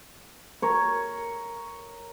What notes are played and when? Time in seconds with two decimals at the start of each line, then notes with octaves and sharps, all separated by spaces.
0.62 A#4 C#5